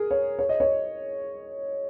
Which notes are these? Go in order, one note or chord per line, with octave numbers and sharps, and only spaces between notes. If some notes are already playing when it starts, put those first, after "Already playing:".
Already playing: G#4 A#4
C#5
C#5
D#5
C#5